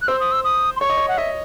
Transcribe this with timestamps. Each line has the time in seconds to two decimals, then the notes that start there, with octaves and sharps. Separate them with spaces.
0.02 F#6
0.08 C5 E6
0.20 D#6
0.32 E6
0.44 D#6
0.76 C6
0.81 C#5 C#6
0.90 D#5
0.97 C#5
1.08 F#5
1.17 D#5 E5